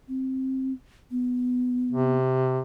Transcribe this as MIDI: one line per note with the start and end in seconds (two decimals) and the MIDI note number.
0.08 0.73 60
1.11 2.15 59
1.91 2.60 48